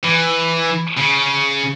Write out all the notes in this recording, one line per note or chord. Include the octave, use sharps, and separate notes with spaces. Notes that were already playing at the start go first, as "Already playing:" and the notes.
E3
C#3